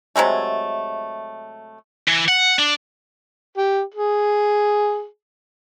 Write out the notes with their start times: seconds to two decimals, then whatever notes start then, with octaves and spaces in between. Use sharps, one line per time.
0.16 C3 F#3 G#3 A3
2.08 E3
2.28 F#5
2.59 D4
3.58 G4
3.94 G#4